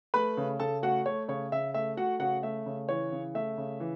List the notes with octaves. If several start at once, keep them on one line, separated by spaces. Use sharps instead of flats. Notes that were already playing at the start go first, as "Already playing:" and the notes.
A3 B4 B5
C#3
C#3 A4 A5
A3 F#4 F#5
A3 C#5
C#3 C#5
C#3 E5
A3 E5
A3 F#4 F#5
C#3 F#4 F#5
A3 E5
C#3
E3 C#5
C#3
A3 E5
C#3
E3